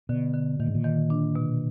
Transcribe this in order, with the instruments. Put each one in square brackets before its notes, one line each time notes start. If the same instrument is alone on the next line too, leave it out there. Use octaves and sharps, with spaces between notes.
[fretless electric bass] B2 [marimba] D3
[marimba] D3
[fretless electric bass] A#2 [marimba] D#3
[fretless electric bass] G#2
A#2
[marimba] D#3
D4
B2